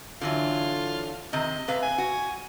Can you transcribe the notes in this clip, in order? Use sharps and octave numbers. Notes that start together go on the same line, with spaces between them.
D3 E3 F#3 F4
C3 D#3 D#5
C3 B4 F5
G#5
F#4